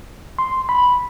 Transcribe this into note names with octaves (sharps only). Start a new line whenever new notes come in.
C6
B5